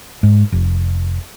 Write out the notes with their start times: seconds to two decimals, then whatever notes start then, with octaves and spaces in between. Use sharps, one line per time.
0.23 G#2
0.52 F1